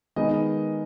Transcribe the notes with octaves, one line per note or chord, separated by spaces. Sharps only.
D#3 G#3 B3 D#5